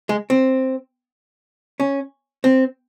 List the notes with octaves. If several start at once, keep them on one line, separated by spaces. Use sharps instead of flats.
G#3
C4
C#4
C4